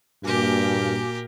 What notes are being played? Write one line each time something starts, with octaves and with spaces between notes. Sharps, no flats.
G2 A#2 A#3 F#4 G4 A#4 G#5 D6